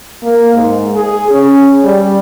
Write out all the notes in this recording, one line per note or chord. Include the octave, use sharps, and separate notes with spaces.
A#3
G#2
G#4
C#4
G3